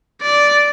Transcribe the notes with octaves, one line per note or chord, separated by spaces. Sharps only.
D5